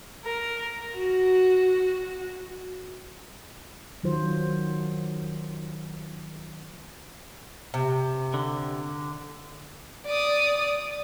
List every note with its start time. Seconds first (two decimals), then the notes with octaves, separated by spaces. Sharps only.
0.25 A#4
0.95 F#4
4.04 D#3 F#3 F4 C5
7.74 C3
8.34 D3
10.06 D5 D#6